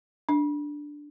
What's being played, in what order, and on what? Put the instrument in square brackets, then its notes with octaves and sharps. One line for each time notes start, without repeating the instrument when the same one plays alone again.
[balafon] D4